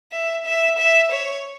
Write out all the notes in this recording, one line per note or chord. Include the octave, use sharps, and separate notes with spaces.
E5
E5
E5
C#5